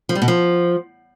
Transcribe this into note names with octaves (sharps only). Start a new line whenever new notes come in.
F3
G3
B2
F3